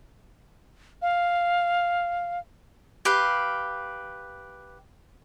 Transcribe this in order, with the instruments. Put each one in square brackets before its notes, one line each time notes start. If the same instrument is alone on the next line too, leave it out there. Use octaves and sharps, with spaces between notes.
[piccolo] F5
[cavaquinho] G4 B4 F5